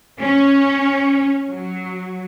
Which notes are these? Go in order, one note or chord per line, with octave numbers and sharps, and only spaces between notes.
C#4
F#3